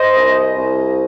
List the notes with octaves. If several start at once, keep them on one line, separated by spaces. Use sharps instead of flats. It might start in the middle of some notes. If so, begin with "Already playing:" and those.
Already playing: C5 D#5
C2
C2